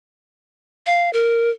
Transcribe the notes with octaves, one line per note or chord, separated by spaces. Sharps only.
F5
A#4